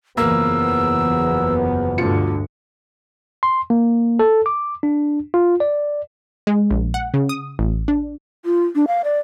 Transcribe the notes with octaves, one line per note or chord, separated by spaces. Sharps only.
F#1 E2 F3 F#3 A#3 B3 E6
D2 G2 B2 D3 F4 C#7
C6
A#3
A4
D6
D4
F4
D5
G#3
A#1
F#5
C#3
D#6
A1
D4
F4
D4
F5
D5